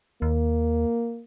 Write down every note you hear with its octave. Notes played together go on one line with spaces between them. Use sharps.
D#2 A#3